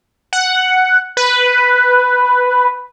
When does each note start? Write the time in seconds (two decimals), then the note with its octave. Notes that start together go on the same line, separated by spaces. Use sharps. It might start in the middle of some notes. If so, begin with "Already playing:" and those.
0.33 F#5
1.17 B4